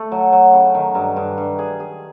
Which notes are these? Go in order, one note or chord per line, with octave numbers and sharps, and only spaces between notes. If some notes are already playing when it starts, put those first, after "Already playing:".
Already playing: A3
F#3
F#3
C#3
D#3
G2
G2
G2
G#4
G#4